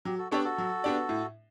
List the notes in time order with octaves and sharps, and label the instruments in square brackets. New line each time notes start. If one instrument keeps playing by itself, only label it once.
[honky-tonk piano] F#3 [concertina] G4
[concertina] F#4 A4
[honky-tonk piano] B3 D4 G4 D5 [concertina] A4 C#5
[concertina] F#4 A4
[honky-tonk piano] F#3
B3 D4 G4 D5
A2